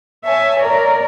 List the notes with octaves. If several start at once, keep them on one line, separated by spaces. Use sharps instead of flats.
C#5 E5 G#5 A5
A#4 C#5 D5